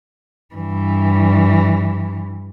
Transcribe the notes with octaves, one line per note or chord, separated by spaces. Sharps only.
G2 E3